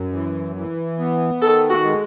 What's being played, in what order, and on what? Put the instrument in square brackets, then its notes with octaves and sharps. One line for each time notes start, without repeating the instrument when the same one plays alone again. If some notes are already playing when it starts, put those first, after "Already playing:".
Already playing: [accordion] F#2
E3
E3
B3
[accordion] D#3 [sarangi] A4
[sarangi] F#4
[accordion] G#3